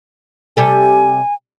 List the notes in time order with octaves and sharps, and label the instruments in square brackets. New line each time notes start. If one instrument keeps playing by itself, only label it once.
[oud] C3 G3 A4 [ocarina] G#5